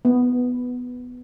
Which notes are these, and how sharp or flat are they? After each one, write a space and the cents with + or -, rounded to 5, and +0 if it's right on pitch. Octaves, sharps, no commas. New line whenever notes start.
B3 +5